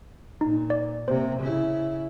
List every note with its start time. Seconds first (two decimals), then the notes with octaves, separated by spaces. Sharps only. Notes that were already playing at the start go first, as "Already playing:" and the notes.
0.41 A#2 D#4
0.70 D5
1.08 C3 A#3 C5
1.40 C#3 E4